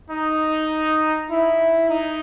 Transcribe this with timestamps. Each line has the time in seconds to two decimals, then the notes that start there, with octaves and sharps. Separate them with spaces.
0.11 D#4
1.30 E4
1.90 D#4